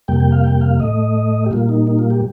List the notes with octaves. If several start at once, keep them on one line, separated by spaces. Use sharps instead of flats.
F2 C3 G3 A#3 G5
G5
F5
G5
F5
A2 A3 D#5
G4
A#2 G3 A#3 F4
D#4
D#4
F4
G4